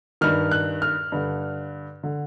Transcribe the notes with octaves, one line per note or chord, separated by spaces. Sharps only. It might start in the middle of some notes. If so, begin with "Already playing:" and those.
G2 D#3 F6
F#6
F6
G2 D3
D3